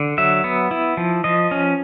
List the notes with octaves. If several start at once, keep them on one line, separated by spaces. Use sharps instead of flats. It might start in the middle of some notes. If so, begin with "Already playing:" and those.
Already playing: D3
F#3 E5
B3
E4
F3
F3 D#5
C#4